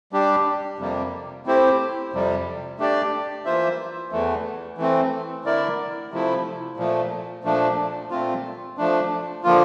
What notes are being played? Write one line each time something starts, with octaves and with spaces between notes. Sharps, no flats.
G3 D4 G4
F2 C3 G3 A#3
A3 C4 E4 G4 C5
F2 C3 G3
A3 D4 G4 D5
E3 A#3 F4 C5 E5
E2 E3 A3
E3 A3 C4
D3 A3 E4 A#4 D5
C3 F3 A3 E4
A#2 F3 A3
A#2 F3 A3 D4
A#2 A3 C4 F4
F3 A3 D4
D3 F3 A#3 F4